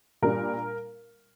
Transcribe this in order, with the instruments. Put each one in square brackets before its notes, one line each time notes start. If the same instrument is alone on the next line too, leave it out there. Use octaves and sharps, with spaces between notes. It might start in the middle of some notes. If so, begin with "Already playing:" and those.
[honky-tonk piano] A#2 G3 D4 A#4